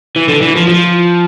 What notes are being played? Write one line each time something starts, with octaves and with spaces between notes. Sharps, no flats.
E3
D3
E3
F3
F3